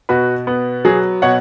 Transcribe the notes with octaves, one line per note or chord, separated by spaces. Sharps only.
B2 F#4 B4
B3
F#3 G#4
B2 C#5 F#5